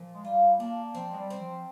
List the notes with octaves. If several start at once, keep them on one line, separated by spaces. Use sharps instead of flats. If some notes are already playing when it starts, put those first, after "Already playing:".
Already playing: A#2 F3
G#3
G3 F4
A#3 D4
F3 C4
G#3
G3
C4
F3